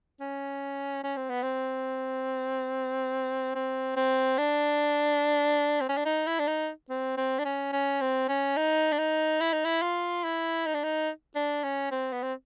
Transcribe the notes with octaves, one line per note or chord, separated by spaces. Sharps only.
C#4
C#4
C4
B3
C4
C4
C4
D4
C4
C#4
D4
D#4
E4
D4
D#4
C4
C4
D4
C#4
C#4
C4
C#4
D#4
D4
D#4
E4
D#4
E4
F4
E4
D#4
D4
D#4
D4
C#4
C4
B3
C4